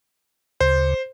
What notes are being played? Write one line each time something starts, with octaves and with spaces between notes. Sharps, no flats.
D2 C#3 C5